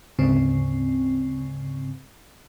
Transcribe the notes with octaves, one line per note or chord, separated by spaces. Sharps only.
D2 G#2 C#3 C4